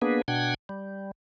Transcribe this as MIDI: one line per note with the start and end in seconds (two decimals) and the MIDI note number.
0.02 0.21 58
0.02 0.21 59
0.02 0.21 62
0.02 0.21 68
0.02 0.21 71
0.28 0.54 47
0.28 0.54 62
0.28 0.54 78
0.28 0.54 79
0.28 0.54 92
0.69 1.11 55